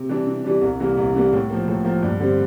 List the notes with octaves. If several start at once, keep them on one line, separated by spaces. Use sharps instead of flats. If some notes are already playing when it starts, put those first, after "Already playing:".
Already playing: C3
E3 G3 D4
C3
E3 G3 D4
C2
C3 E3 G3 A#3
C2
C3 E3 G3 A#3
A2
F3 A#3
A2
F3 A#3
G2
D3 G3 C4